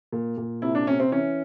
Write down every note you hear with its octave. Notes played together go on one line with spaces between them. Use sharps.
A#2
A#2
C3 E4
D4
C3 C#4
C4
E3 C#4